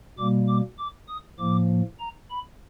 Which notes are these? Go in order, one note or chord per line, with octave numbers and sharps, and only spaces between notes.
B2 G3 A#3 D6
D6
D6
D#6
A2 F3 A#3 D6
A#5
B5